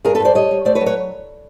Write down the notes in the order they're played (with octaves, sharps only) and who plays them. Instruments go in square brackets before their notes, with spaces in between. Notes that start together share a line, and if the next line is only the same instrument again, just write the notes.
[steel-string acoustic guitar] G2 G#4 A#4
A4 B4
G2 C5 D5
G3 C#5 D#5
G3
A3 C5 D5
B4 C#5
F#3
B4 C#5